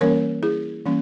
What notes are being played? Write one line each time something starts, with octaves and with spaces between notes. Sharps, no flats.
E3 G3 A#3 C#4 A#4 C#5
E4 G#4
E3 G3 A#3 C#4